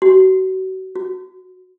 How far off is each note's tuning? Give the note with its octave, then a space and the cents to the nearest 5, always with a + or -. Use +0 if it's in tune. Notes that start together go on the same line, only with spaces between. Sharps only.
F#4 +35
F#4 -15